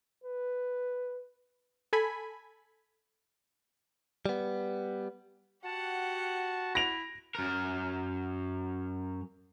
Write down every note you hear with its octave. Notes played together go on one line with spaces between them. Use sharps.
B4
A4 G#5 B5
G3 B3
F#4 G4 F#5 A5
E4 A#6 D7 F7
F#2 A#4